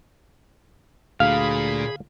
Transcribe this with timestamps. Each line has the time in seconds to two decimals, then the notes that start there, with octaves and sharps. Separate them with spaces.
1.20 D2 A#2 G#4 F5 B5